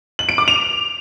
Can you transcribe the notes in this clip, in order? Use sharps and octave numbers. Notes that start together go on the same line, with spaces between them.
F#7
D7
D6
F7